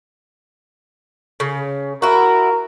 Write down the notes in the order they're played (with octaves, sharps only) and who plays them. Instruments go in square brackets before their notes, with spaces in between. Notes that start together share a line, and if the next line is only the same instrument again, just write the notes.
[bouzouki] C#3
[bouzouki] E4 F#4 [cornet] A#4